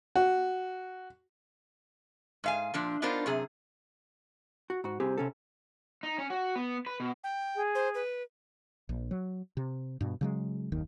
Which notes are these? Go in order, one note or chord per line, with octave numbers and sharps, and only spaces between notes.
F#4
G#2 F5 G#5
A#2 F3 D4
B3 D4 D#4 F4 A#4 C5
F#2 C3 G#4
F#4
G#2 F#4
C2 C4 G4 G#4
C3 C#4 A4
D#4
C#4
F#4
B3
B4
B2
G5
G#4
C5
B4
A#1
F#3
C3
G2 B2
C#3 F#3 G#3
F#1 D#2 D#3